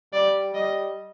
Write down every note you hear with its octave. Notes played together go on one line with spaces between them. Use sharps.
G3 D5
G3 D#5